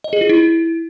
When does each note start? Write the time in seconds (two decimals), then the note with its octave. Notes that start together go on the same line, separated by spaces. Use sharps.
0.04 D#5
0.13 G#4
0.21 F4
0.29 E4